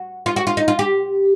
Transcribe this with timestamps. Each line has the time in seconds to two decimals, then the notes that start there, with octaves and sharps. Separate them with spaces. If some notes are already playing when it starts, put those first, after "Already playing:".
Already playing: F#4
0.26 F4
0.36 F#4
0.47 F4
0.57 D#4
0.68 F4
0.79 G4